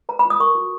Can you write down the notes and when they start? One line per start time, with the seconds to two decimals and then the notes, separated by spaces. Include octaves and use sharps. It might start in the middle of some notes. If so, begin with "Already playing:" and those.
0.09 B4 A#5
0.19 B5
0.25 F4
0.30 D#6
0.40 A#4 C#6
0.55 F#4